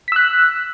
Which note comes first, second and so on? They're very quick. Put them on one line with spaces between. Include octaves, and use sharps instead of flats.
B6 E6 F#6